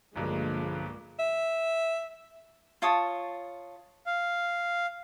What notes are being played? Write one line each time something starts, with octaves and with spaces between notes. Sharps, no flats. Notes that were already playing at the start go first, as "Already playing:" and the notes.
B1 G2 D3 F3 G#3 A#3
E5
F4 C#5 A5 D#6
F5